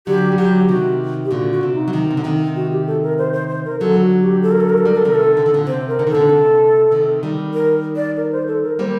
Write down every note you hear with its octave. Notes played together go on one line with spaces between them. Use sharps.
D3 F#3 G4
G3
D3 F#3 G4
C3 D#3 F#4
G4
A#2 D3 F#4
F#4
C3
D#4
F#3
C3 D#3
C3
D3
C3 D#3
F#4
G4
A4
A#4
C5
C5
C5
A#4
D3 F#3 A4
F#4
G4
A4
A#4
A4
A#4
A4
G3 A#4
F#3 A4
C3 D#3 A#4
A4
D3
D#3
A#2 D3
C3 C5
A#4
D3
D#3
A4
A#2 D3
C3
C3 D#3
D#3 G3
A#4
D5
A#4
C5
A4
A#4
G3 A#3 C5